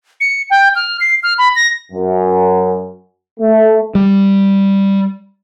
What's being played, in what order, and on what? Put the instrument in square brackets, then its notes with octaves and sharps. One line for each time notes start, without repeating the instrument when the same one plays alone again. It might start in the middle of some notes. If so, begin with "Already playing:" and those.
[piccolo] C#7
G5
F6
C7
F6
B5
A#6
[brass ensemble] F#2
A3
[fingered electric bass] G3